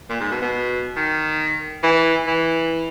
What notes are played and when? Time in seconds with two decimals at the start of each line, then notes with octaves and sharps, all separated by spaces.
0.10 A#2
0.20 G#2
0.31 B2
0.42 B2
0.97 D#3
1.83 E3
2.27 E3